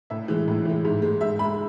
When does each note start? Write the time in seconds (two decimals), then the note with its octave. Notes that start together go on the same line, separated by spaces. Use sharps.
0.10 A2 E5
0.28 E3 G#3
0.48 A2
0.65 E3 G#3
0.85 G#2
1.02 G#3
1.21 G#2 E5
1.39 G#3 B5